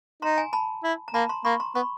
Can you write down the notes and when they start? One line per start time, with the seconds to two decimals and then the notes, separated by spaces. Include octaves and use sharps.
0.22 D#4 A#5 C6
0.38 G#5 A#5
0.53 A5 B5
0.84 E4
1.08 A#5
1.14 A#3 A5 B5
1.29 A#5 C6
1.45 A#3 B5 C#6
1.60 A#5 C6
1.75 B3 B5 C#6